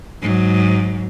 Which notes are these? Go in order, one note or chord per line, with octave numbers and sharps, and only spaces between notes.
G#2 F#3